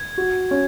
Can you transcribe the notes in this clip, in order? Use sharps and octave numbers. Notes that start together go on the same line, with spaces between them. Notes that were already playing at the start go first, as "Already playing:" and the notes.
Already playing: G#6
F#4
C#4